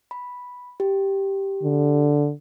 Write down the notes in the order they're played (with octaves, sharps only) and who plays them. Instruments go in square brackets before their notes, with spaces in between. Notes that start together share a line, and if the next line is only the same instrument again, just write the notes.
[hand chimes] B5
G4
[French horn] D3